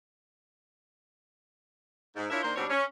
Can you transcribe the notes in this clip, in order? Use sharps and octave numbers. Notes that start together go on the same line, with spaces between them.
G#2
D4 E4 F4 A#4 C#5 E5
D#3 A#3 D4 C5
G#2 B2 G3 C4 D4 C#5
C#4